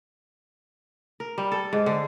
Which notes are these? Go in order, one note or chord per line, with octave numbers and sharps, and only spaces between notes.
A#4
G3
A4
G#2
D3